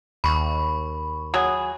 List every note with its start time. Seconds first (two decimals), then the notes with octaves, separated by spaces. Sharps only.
0.24 D#2 B5 C#6
1.34 F#3 G#4